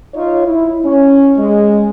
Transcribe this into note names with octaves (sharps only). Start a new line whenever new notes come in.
D#4 F4 C#5
E4
C#4
G#3